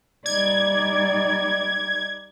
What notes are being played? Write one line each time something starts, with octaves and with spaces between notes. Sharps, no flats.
G3 D#4 D5 G#6